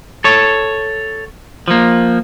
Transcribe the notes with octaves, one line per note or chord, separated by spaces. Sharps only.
A4 C#5
F3 A#3